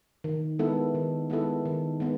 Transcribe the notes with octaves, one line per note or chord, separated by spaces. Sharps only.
D#3
G#3 B3 E4 A4
D#3
G#3 B3 E4 A4
D#3
G#3 B3